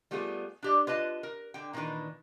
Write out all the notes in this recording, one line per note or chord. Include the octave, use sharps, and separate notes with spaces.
G3 A3 B3 F4 G#4
D4 G4 D5
F4 B4 D#5 A5
A#4
D3 G5
A#2 D#3 E3 D4 B4